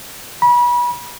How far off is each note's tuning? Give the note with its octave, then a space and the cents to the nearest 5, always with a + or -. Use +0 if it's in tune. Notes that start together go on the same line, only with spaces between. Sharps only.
B5 -30